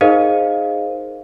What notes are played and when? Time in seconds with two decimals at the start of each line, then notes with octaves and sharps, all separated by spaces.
0.01 D#4 G#4 A#4 C5 D#5 F5